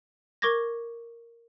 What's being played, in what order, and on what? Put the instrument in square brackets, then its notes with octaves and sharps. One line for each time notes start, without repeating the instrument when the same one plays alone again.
[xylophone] A#4 C#6 D6 G#6 A#6